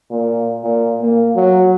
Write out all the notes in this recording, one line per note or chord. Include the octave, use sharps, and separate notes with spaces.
A#2
A#2
A#3
F#3